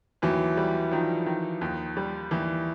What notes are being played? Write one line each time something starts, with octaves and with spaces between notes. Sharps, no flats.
D#2 E3 F#3
G3
D#3 F3
D#3
D#2
G3
D#2 E3